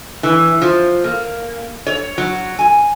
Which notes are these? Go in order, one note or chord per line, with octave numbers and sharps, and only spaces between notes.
E3
F3
A#3
C#5
F#3
G#5